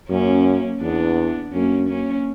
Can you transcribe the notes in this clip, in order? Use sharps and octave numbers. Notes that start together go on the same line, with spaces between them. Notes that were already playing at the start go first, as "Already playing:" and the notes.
F#2 A#3 C#4
E2 B3 D4
F#2 A#3 C#4
A#3 C#4